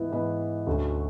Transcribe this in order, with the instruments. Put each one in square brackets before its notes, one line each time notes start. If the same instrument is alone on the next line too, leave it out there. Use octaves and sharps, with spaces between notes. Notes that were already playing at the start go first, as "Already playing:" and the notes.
Already playing: [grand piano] G#2 E3 B3 E4 B4
G#2 E3 B3 E4 B4
D2 D3 A3 C#4 F#4